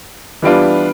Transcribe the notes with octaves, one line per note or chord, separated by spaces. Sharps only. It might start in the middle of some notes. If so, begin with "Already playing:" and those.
E3 G3 B3 D4 F4